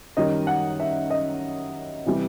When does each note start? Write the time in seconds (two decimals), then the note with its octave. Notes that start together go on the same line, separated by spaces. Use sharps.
0.16 F#2 D#3 G3 D#5
0.47 F#5
0.80 E5
1.10 D#5
2.06 C3 E3 G3